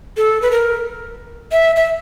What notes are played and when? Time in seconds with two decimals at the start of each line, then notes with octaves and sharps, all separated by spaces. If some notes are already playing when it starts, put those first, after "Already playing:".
0.17 A4
0.42 B4
0.51 A#4
1.52 E5
1.76 E5